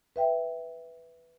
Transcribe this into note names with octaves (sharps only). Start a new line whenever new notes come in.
B4 E5 G5